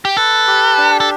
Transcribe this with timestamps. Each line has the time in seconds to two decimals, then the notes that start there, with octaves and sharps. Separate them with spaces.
0.05 G4
0.17 A4 B4
0.48 G4
0.78 D4
1.00 A4